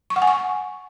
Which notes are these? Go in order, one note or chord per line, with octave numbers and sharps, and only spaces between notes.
C#6
F#5
G#5
C#6